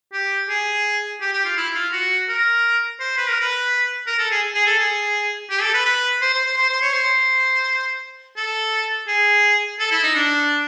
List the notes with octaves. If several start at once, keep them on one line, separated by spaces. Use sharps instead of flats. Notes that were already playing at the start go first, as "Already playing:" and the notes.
G4
G#4
G4
G4
F4
E4
F4
F#4
A#4
C5
B4
A#4
B4
A#4
A4
G#4
G#4
A4
G#4
G4
A4
B4
B4
C5
C5
C5
C5
C5
C#5
C5
A4
G#4
A4
E4
D#4
D4